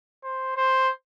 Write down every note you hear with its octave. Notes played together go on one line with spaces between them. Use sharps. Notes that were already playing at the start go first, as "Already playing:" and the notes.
C5
C5